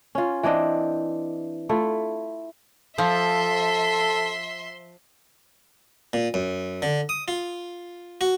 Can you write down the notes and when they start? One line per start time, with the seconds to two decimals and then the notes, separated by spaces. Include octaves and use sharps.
0.15 C#4 F4
0.43 E3 C4 D4 D#5
1.69 A3 E4 F4
2.98 F3 A4 E5 C6
6.13 A#2
6.34 F#2
6.82 D3
7.09 D#6
7.28 F4
8.21 F#4